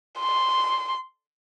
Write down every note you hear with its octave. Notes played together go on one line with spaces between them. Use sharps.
C6